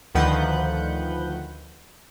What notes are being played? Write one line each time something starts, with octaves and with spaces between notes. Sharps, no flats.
D2 D#3 F3 B4 F#5 G6